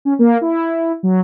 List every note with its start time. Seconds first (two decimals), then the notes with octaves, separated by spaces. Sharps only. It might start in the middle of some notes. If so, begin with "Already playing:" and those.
0.05 C#4
0.19 A#3
0.41 E4
1.03 F#3